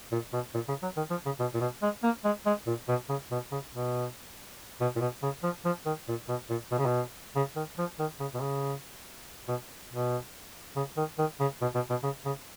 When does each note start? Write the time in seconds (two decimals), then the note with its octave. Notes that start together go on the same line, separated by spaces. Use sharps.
0.12 A#2
0.33 B2
0.54 A#2
0.69 C#3
0.83 F#3
0.97 D#3
1.10 F3
1.26 C#3
1.39 B2
1.54 A#2
1.61 B2
1.82 G#3
2.03 A#3
2.24 G#3
2.46 G#3
2.67 A#2
2.88 B2
3.09 C#3
3.31 B2
3.52 C#3
3.74 B2
4.81 B2
4.96 A#2
5.01 B2
5.23 C#3
5.43 F3
5.65 F3
5.86 D#3
6.08 A#2
6.28 B2
6.50 A#2
6.71 B2
6.79 C#3
6.86 B2
7.36 C#3
7.56 D#3
7.78 F3
7.99 D#3
8.20 C#3
8.34 B2
8.42 C#3
9.48 B2
9.91 B2
10.76 C#3
10.97 D#3
11.19 D#3
11.40 C#3
11.62 B2
11.75 B2
11.90 B2
12.03 C#3
12.25 C#3